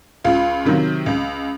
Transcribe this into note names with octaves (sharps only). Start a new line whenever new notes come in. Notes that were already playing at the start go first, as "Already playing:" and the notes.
C#2 F4
C3 D#3 F#3
C#2